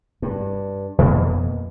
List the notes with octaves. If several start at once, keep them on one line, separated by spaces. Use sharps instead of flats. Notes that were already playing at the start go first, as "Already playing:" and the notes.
G2
F2 B2 A#3